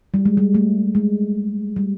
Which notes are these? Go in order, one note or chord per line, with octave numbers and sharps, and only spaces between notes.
G3
G#3
G3
A3
G#3
G3